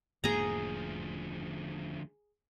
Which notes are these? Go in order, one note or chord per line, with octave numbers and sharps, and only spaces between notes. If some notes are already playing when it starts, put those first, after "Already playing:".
E1 D2 G#2 F3 A#3 G#4 A#5